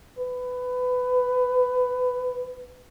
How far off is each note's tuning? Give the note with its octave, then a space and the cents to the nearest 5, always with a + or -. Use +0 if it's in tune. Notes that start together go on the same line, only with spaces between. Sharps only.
B4 +20